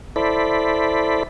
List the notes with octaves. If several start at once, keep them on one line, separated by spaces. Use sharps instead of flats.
E4 A4 C5 D5 B5